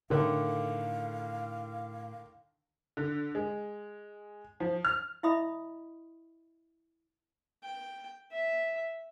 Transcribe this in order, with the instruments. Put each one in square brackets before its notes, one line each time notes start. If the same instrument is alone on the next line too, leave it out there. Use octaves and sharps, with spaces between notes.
[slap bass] A2 [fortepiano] D3 D#3 [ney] F5
[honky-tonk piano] D3
G#3
F3
F6
[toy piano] E4 D#5 E5 B5 D#6
[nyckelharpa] G5
E5